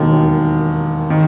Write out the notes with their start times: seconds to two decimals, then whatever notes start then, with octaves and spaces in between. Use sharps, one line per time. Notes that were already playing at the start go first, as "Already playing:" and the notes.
Already playing: E1 D#2 D#3 F#3
1.10 D#3